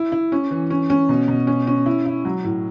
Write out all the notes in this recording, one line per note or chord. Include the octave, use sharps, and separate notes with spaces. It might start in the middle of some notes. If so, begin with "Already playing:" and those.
Already playing: E4
E4
C#4
E3
C#4
C#4
B2
B2
C#4
C#4
E4
E4
F#3
A2